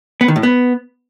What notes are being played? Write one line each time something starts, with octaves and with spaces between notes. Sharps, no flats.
B3
D#3
A2
B3